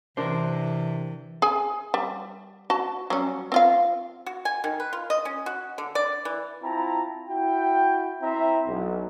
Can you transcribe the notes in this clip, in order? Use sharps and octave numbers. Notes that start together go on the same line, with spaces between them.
C3 E3 D4 A#4 C5
G#4 G#5
G3
F#4 A5
F#3 G3 C#4
C4 F4 F5
F#4
G#5
D#3
B4
F4
D#5
C#4
F#4
D3
D5
E3
C4 E4 F4 G5 A5 A#5
E4 F#4 G5
C4 E4 E5 A#5
B1